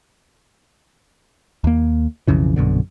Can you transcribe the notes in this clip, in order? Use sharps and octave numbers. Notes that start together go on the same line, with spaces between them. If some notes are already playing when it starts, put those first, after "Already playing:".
D#2 A#3
B1 F2 C#3 E3
A#1 F#2 B2 D3